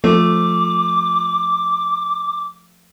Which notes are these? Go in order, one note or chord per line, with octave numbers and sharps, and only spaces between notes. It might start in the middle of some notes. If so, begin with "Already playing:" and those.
F3 A3 D6